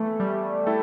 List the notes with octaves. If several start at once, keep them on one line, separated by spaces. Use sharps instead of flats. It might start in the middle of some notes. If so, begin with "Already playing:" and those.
Already playing: E3 A3 B3
G3
A3 E4 A4